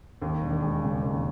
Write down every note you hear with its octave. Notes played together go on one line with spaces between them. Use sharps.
D#2
E1
G#3
C#3
D#2